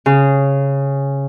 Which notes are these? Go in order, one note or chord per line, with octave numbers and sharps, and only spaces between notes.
C#3